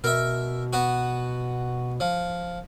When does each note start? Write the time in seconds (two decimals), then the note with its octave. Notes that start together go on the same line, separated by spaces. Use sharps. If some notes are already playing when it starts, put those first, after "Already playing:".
0.04 B2 A#4 E5
0.73 B3 F#4
2.00 F3